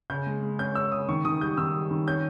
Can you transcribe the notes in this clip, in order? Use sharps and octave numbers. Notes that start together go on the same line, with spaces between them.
C#3 G6
G#3
G#3
C#4 G6
C#4 E6
C#3 D#6
D#3 C#6
D#3 D#6
G3 G6
D#3 E6
G3
D#3
C#4 G6